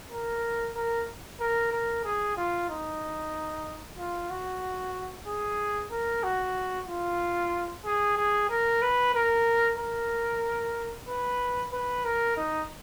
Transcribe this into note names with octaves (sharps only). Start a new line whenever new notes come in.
A#4
A#4
A#4
A#4
G#4
F4
D#4
F4
F#4
G#4
A#4
F#4
F4
G#4
G#4
A#4
B4
A#4
A#4
B4
B4
A#4
D#4